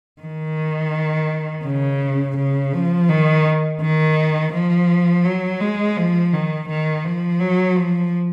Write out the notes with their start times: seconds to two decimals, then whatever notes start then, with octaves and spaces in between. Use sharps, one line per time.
0.21 D#3
1.65 C#3
2.37 C#3
2.73 F3
3.09 D#3
3.81 D#3
4.53 F3
5.25 F#3
5.61 G#3
5.97 F3
6.34 D#3
6.69 D#3
7.05 F3
7.40 F#3
7.77 F3